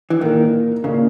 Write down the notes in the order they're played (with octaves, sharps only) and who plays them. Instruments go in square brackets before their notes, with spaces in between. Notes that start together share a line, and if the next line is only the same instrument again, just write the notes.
[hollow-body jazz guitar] E3
[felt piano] A#2 A#3 D#4 A#4 [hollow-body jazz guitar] D#3
[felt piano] A#2 A#3 D#4 A#4 [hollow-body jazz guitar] C#3